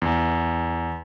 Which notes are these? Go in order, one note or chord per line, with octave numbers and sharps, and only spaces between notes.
E2